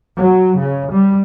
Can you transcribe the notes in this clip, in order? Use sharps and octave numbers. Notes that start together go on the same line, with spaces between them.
F#3
C#3
G3